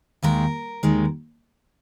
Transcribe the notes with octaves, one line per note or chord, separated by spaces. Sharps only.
D#2 D#3 G#3 A#4
D#2 D#3 G#3